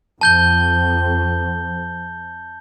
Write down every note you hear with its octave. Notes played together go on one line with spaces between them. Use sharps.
F2 A5 G6 G7